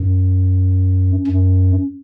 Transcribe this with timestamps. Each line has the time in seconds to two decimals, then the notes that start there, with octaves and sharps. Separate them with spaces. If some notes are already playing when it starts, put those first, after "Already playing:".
Already playing: F#2
1.27 F#2